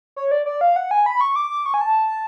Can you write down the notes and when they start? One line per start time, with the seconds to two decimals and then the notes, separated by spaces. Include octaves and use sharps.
0.16 C#5
0.32 D5
0.46 D5
0.61 F5
0.76 F#5
0.91 G#5
1.06 B5
1.21 C#6
1.36 D6
1.66 C#6
1.74 G#5
1.81 A5